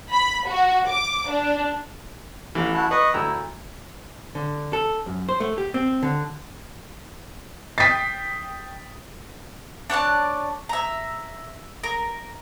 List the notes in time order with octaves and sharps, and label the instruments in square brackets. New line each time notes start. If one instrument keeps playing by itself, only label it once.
[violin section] B5
F#4
D6
D4
[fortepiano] A1 E3
[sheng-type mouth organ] E4 F#4 A5
[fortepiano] B4 [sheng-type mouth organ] D#5 C#6 D#6
[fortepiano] D2 A#5 E6 [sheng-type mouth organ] E4
[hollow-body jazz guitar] D3
A4
F#2
C5
A3
G4
C4
D3
[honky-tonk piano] G5 D#6 C7 [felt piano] A6 B6
[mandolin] D4 C#5 D5 A5
E5 A#5
A#4